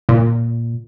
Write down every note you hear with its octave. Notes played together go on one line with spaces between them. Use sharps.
A#2